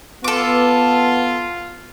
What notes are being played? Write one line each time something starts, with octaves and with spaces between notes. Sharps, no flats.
B3 F4 A4 D6